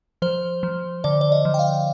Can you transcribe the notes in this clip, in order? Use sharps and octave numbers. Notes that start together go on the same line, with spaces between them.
F3 C5
F3
D3 D5
D5
D#5
F3
G5
F5